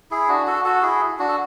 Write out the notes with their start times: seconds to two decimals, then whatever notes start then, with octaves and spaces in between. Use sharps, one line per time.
0.11 E4 G#4
0.28 D4 F#4
0.46 F#4 A4
0.64 F#4 A4
0.82 E4 G#4
1.19 D4 F#4
1.28 A4